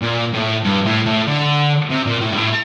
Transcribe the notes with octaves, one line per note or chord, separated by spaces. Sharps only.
A#2
A2
G2
A2
A2
D3
C3
A#2
A2
G2
A2